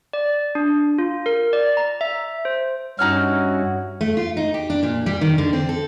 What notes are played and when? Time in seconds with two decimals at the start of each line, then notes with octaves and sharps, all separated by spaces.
0.13 D5
0.55 D4
0.98 F4
1.26 A#4
1.53 D5
1.77 A#5
2.01 E5
2.45 C5
2.99 G2 C#4 D#4 E4 F#4 F6
4.01 A3
4.17 F4
4.37 D#4
4.54 G4
4.70 D4
4.83 A#2
5.06 G3
5.21 D#3
5.38 D3
5.53 C4
5.69 A4